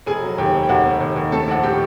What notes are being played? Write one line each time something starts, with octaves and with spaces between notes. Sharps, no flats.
F1 G#4 G#5
F#3
D#2 G4 G5
F1
G5
D#2 F#4 F#5
F1
D#2
D#2
A3 A4 A5
A#1 F#5
A2 G4 G5